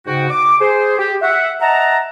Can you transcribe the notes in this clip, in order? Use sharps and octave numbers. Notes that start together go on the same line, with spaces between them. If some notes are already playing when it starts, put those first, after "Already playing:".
G#2 C#3 F#4 G5
D6
G#4 C5
G4
E5 F#5
D#5 E5 F#5 A5 A#5